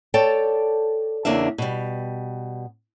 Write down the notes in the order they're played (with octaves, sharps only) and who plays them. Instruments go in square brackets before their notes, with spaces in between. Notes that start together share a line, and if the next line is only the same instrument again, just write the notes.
[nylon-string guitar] A4 C#5 D5 G5 A5
E2 C#3 A#3 D4 E5
B2 G3